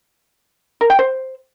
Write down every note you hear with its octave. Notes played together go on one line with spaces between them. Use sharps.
A#4
G5
C5